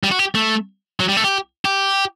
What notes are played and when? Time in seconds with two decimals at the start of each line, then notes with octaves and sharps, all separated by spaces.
0.03 G3
0.11 F#4
0.19 G4
0.35 A3
1.00 F#3
1.09 G3
1.17 A3
1.24 G4
1.65 G4